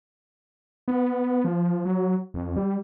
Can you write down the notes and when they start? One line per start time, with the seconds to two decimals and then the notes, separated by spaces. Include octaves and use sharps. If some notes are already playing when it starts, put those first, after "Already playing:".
0.88 B3
1.44 F3
1.85 F#3
2.34 F2
2.56 G3